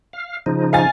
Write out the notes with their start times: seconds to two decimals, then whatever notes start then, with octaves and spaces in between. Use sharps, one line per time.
0.13 F5
0.46 C#3 F3 D#4
0.73 F5 G#5 A6